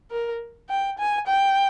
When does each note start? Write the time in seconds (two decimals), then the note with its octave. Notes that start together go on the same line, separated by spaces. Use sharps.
0.11 A#4
0.69 G5
0.98 G#5
1.27 G5